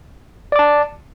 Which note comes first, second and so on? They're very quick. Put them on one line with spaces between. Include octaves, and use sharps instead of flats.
D5 D6 A5